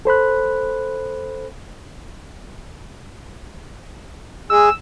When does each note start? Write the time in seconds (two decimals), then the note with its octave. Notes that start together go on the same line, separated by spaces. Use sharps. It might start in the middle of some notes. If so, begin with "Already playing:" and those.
0.05 A4 C5 B5 F#6
4.50 G#3 E6